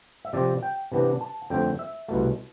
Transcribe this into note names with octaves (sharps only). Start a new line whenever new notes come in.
E5
C3 F3 C4 D5
G5
C3 E3 B3 D4
A5
F2 D3 A3 C4 G5
E5
C2 B2 A3